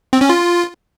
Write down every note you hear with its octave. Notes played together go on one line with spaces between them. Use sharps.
C4
C#4
F4